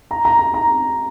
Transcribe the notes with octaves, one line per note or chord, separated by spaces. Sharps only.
A#5
A#5
A#5
A#5